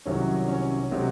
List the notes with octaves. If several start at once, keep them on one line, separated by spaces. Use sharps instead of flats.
C2 C3 D#3 F#3 C#4
C#4
C3 F#3 C4 D#4